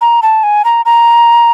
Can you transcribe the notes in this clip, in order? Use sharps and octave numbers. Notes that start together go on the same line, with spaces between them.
A#5
A5
G#5
A#5
A#5